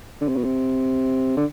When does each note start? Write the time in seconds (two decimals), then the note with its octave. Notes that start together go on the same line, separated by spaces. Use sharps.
0.21 D3
0.28 C3
0.36 B2
0.44 C3
1.37 D3